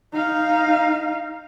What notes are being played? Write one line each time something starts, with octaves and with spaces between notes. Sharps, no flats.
D#4 F5